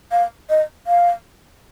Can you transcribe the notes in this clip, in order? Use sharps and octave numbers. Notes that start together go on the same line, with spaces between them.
F5
D#5
F5